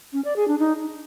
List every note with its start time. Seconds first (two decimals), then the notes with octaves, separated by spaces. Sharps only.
0.13 C#4
0.25 D5
0.36 G#4
0.48 D4
0.59 D#4